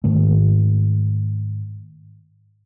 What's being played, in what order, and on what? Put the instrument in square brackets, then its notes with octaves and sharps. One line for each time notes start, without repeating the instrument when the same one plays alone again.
[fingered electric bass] G#2 D#3 A3